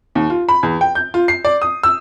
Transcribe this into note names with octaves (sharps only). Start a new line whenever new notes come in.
D#2
F4
B5
E2
G5
G6
F4
C7
D5
D#6
E6